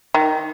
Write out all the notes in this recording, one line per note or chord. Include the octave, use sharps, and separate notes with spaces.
D#3